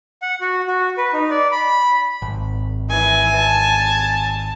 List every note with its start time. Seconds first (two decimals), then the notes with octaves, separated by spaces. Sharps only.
0.22 F#5
0.41 F#4
0.67 F#4
0.97 B4
1.13 D#4
1.31 D5
1.52 B5
2.22 G#1
2.90 E3 G#5
3.37 A5